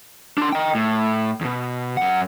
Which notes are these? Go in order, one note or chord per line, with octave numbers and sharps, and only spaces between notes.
D4 C6
D#5 G5
A2
E2 B2
F#2 F#5